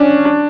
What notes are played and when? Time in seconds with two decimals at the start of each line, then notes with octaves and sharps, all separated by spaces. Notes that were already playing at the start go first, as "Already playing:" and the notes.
Already playing: C#4 D4
0.25 D4